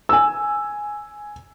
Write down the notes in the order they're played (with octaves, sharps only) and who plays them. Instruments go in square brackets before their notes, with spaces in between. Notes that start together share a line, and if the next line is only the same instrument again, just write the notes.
[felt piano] G#5 E6